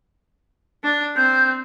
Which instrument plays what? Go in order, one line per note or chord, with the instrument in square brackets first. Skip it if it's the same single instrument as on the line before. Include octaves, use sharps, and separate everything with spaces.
[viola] D4
[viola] C4 [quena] G6